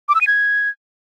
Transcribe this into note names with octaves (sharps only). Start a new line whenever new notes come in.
D6
E6
D#7
G#6